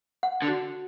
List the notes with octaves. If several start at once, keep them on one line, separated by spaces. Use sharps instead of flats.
F#5
D3
F#4